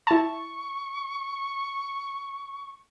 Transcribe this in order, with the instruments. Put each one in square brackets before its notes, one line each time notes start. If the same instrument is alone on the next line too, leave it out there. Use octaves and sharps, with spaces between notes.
[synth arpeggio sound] E4 A5 [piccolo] C#6